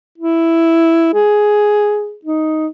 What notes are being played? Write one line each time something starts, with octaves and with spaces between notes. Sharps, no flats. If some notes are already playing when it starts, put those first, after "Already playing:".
E4
G#4
D#4